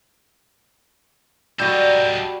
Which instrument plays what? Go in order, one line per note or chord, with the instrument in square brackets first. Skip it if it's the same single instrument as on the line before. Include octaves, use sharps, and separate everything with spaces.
[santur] G3 B5 [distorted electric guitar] D#4 A4 [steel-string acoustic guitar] F#4 G4 [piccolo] G6